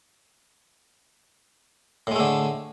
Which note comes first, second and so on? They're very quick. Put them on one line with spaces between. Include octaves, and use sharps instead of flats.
A2 G#3 A3 D3